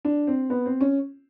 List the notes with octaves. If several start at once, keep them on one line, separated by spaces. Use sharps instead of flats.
D4
C4
B3
C4
C#4